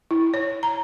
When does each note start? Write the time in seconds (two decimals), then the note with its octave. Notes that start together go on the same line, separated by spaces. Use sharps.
0.11 E4
0.34 C#5
0.63 A#5